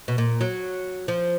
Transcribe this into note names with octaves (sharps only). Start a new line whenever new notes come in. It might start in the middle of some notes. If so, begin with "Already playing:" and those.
B2
A#2
F#3
F3